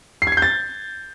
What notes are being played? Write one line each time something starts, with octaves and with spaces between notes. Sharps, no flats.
C7
G#6
C7
G6
A6